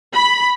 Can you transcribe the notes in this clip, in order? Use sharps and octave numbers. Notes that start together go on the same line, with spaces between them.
B5